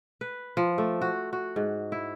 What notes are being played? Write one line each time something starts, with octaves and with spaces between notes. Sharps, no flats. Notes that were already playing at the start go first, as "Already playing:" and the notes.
B4
F3
A3
F#4
F#4
G#2
E4